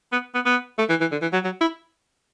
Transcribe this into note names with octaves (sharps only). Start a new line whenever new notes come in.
B3
B3
B3
A3
E3
E3
D3
E3
F#3
F#3
E4